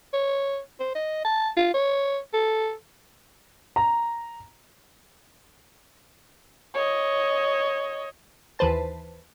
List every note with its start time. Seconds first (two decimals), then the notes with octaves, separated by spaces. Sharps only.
0.13 C#5
0.80 C5
0.95 D#5
1.25 A5
1.56 F4
1.74 C#5
2.34 A4
3.76 A#5
6.74 C#5 D#5
8.59 D#2 E3 B4 C5 A5